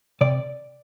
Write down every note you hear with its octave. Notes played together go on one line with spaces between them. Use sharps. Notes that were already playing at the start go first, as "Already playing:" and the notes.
C3 D5